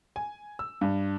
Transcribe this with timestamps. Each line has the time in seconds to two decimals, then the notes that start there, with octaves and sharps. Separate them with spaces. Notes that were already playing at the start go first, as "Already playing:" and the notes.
0.16 G#5
0.59 E6
0.81 G2